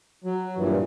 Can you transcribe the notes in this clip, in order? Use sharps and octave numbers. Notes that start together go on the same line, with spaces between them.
F#3
G2 A#2 E3